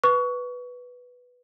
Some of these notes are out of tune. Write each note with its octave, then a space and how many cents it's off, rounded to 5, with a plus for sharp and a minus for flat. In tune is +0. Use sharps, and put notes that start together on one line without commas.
B4 +0 C#6 +25